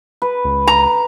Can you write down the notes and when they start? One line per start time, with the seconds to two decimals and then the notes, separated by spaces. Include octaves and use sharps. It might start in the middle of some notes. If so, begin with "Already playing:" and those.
0.22 B4
0.45 C#2
0.67 A#5